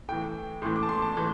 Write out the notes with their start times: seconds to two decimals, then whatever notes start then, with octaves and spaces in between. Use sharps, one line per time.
0.08 A2 E3 G5
0.62 A2 E3 C6
0.76 D6
0.83 A5
0.89 C6
1.02 A5
1.16 A2 E3